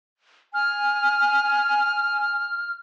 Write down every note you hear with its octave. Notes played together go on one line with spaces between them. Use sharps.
G#5 F6